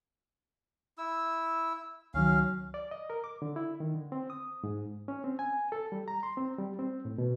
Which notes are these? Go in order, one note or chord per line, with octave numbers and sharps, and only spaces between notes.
E4 E6
C#2 D#3 F#3 C#4 F5
D5
D#5
A#4
D6
D3
E4
D#3
D3
C4
D#6
G#2
C#4
C4
G#5
A4
G3
A#5
C6
C4
G3
C4
A2
B2